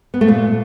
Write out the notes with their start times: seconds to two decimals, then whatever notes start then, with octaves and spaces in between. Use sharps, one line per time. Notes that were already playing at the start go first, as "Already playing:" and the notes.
0.14 B3
0.21 A3
0.28 A#2